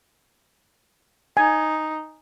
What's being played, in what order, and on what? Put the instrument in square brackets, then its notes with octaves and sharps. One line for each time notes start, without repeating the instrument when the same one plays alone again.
[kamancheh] D#4 [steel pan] G#5